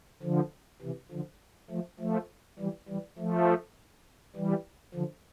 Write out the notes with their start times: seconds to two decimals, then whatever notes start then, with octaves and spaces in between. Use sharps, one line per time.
0.22 D3 F3
0.82 C3 E3
1.12 D3 F3
1.70 F3 A3
1.99 F3 A3
2.59 E3 G3
2.89 E3 G3
3.19 F3 A3
4.36 E3 G3
4.95 D3 F3